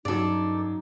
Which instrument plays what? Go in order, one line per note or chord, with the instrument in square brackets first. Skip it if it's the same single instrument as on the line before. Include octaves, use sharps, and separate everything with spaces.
[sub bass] G2 [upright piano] C#3 F#3 [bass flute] D#4 [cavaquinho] A4 D5